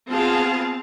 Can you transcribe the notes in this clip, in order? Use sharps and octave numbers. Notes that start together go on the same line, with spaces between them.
B3 C4 F4 G#4 F5 A5